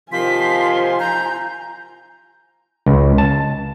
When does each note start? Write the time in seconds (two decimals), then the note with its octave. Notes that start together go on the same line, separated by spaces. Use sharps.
0.12 C3 D#3 F3 F4 G#5 C6 B6
0.99 A#5 G6
2.86 C#2
3.18 A5